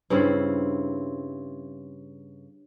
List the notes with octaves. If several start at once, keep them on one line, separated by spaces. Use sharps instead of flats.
G2 C#3 C4 E4